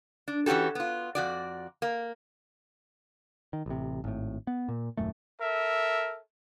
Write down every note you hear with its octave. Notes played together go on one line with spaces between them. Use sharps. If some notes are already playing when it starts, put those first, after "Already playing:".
D4
E3 C#4 F#4 G4 A4
B3 F4
F2 F#4 D5
A#3
D#3
A1 C3
G#1 A2
B3
A#2
D#1 F#2 A3
A4 A#4 E5